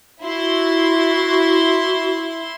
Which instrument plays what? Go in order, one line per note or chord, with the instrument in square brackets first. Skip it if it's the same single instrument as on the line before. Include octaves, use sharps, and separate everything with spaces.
[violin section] E4 C6 [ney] F#4